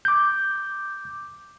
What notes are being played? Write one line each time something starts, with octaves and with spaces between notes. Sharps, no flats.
D6 G6